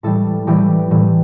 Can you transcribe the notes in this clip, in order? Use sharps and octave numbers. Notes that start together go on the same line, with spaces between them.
A2 E3 G3 A4
A2 E3 G3 G4
A2 E3 G3